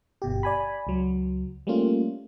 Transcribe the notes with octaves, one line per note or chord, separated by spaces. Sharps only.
G1 B2 G4
D5 G#5 B5
C#2 F#3
G3 A3 A#3 C#4 F4